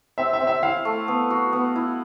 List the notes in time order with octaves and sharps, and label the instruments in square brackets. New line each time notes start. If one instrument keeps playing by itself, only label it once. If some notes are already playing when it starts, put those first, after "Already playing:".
[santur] C4 [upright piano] E5
[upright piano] E5
[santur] C4
[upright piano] E5
[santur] E4 [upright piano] F5
[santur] A3
B3
F#4
B3
E4